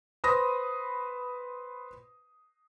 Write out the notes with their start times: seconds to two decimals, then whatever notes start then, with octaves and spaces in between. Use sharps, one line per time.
0.24 B4 C5 B5 C6 D#6 A#6